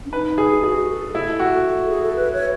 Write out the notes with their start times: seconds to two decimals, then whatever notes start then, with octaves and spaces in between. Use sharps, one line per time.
0.06 C#4
0.13 D#4 B4
0.38 G#4
0.63 F#4 G#4
0.89 A4
1.15 E4
1.40 F#4
1.89 G#4
2.02 A4
2.16 B4
2.33 C#5